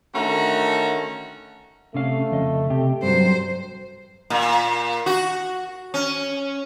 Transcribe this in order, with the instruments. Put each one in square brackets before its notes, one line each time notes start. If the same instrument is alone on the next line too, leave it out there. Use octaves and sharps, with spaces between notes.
[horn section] D3 D#3 A3 C#4 F#4 A#5
[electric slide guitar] C3 C#4 F5 [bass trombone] A3
[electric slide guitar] F2 C#3 D#5
[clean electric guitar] C3 [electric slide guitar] G4
[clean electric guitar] G2 F#3 [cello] C5
[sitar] A#2
F#4
C#4